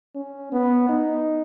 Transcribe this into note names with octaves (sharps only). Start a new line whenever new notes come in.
C#4
B3
D#4